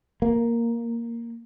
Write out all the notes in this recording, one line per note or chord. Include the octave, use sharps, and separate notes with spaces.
A#3